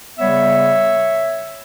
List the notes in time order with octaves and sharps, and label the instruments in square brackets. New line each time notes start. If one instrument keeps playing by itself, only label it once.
[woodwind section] C#3 G3 B3 C#5 E5